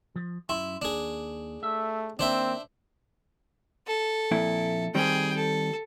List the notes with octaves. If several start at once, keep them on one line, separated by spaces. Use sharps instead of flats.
F3
F#2 E4 C6
D#2 D4 G#4
A3 E5
D#3 A#3 C4 D4 C5 E5
A4
F2 A#2 E4
D#3 G3 C4 G#4 G5
A4